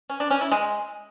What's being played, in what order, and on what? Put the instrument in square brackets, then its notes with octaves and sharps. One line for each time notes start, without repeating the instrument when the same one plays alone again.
[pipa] C#4
D4
C#4
E4
G#3